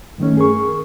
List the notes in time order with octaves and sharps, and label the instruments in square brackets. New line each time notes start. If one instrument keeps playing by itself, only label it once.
[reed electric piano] G2 D#3 A3 C#4
G#4 A#4 C#6